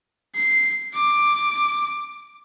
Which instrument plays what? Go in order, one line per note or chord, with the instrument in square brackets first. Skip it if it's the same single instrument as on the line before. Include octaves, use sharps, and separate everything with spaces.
[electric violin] C7
D6